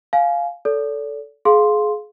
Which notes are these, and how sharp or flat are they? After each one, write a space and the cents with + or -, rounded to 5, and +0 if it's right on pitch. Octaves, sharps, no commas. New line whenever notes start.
F5 +0 G#5 +25
A4 +0 D5 -40
G#4 +25 F5 +5 C6 +0